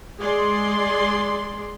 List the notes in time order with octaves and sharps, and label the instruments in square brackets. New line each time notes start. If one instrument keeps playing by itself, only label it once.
[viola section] G#3 G#4 D5 C6